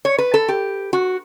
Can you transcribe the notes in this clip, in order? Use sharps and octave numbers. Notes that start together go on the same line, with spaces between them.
C#5
B4
A4
G4
F#4